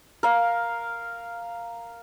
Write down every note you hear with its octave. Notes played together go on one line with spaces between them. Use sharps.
A#4 F5